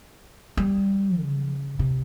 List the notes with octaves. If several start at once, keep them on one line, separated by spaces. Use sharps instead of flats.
G3
C#3
C3